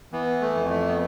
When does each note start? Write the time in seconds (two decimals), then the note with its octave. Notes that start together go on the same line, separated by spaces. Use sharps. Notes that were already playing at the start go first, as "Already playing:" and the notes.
0.12 E3 B3
0.41 A3
0.55 F2
0.69 A3
0.88 B3